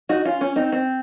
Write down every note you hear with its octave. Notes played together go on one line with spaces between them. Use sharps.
D#4 F#4
C#4 F4
C#4
C4 D#4
C4